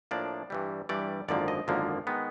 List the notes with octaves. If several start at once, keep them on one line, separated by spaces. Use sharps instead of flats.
A2 F3 A#3 D4 D5
G2 E3 G3
G2 E3 G3 D5
G#1 F#2 D3 F3 A#3 D5
D#5
G#1 F#2 D3 F3 A#3
D#3 G#3 B3